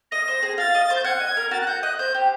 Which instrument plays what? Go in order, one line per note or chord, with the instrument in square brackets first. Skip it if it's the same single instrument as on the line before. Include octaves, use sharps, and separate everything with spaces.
[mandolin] D#5 [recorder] A#6
[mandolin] C5
G#4
[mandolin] F4 [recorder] A6
[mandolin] D#5
C5
[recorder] G6
[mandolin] F#5 [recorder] G#6
[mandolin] D#5
A#4
[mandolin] F#4 [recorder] A6
[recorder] F#6
[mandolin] F#5 [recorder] G6
[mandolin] D#5 [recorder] F#6
[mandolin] C5 [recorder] G6
[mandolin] G4